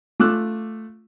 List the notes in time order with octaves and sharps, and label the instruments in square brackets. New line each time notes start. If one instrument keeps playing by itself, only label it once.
[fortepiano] A3 F4 D6 E6 F#6